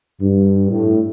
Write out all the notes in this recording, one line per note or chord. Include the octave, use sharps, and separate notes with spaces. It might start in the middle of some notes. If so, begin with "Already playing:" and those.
G2
A2